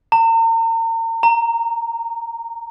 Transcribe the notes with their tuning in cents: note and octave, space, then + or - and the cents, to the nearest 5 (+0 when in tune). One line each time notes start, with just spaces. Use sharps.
A#5 -40
A#5 -10